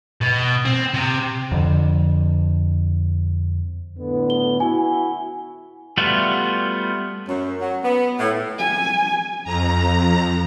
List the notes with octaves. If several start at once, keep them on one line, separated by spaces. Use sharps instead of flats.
B2
C4
C3
F2 D3
A2 D3 B3
G7
E4 F#4 G#5
G3 A3 B3 F4 F#4
F#2
F#3
B3
A2
G#5
F2 A#5